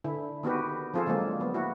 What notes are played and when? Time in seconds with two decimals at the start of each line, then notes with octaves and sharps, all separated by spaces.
0.04 D3 E4
0.43 D#3 B3 F#4 G4 B4
0.94 F3 C4 F4 G#4 A4
1.07 D3 F#3 G#3 A#3
1.40 F#3 B3
1.54 A#3 E4 F#4